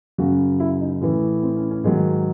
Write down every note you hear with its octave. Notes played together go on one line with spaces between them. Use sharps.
F#2 C#3 F#3 F#4
E4
D#4
A2 E3 C#4
C4
C#4
C#4
G#2 D#3 F#3 G#4